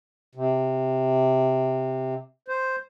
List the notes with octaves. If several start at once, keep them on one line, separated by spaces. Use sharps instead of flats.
C3
C5